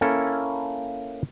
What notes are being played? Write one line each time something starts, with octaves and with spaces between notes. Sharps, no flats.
A#3 C#4 E4 A4